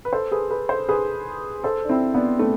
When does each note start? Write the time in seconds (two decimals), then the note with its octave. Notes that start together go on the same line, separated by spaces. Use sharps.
0.05 B4
0.13 A4 C5
0.32 G#4 B4
0.50 G#4 B4
0.69 A4 C5
0.89 G#4 B4
1.64 A4 C5
1.85 D4
1.89 C4 E4
2.14 B3 D4
2.39 A3 C4